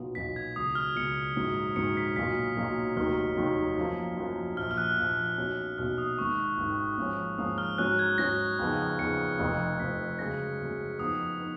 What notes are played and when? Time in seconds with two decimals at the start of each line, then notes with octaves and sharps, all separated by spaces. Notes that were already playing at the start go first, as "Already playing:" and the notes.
Already playing: B1 A#2 F#3 B3 F4
0.15 B1 A#2 F#3 B3 F4 B6
0.36 G#6
0.56 C#2 B2 F#3 D#6
0.75 F6
0.96 C#2 B2 F#3 C#7
1.36 A#1 G#2 D#3 F#3
1.76 A#1 G#2 D#3 F#3 C#7
1.97 B6
2.16 B1 A#2 F#3 A#3 B6
2.57 B1 A#2 F#3 A#3
2.97 F1 D#2 D#3 F#3 F6
3.37 F1 D#2 D#3 F#3
3.77 F#2 F3 A#3
4.17 F#2 F3 A#3
4.57 A#1 A#2 F3 F6
4.71 F6
4.77 F#6
4.97 A#1 A#2 F3
5.37 B1 B2 A#3 C#4
5.78 B1 B2 A#3 C#4 F6
5.98 D#6
6.18 G#1 G#2 D#3 C#6
6.57 G#1 G#2 D#3
6.98 G#2 F3 A#3 C#4
7.38 G#2 F3 A#3 C#4 D#6
7.58 F6
7.78 G#2 F#3 C#4 F#6
7.99 G#6
8.18 G#2 F#3 C#4 A#6
8.59 F2 C#3 F3 B3 D#4
8.99 F2 C#3 F3 B3 D#4 C#7
9.39 F1 F2 F3
9.80 F1 F2 F3 B6
10.19 F#2 C#3 G#3 A#6
10.59 F#2 C#3 G#3
10.99 F2 F3 B3 D#4 D#6
11.40 B3 D#4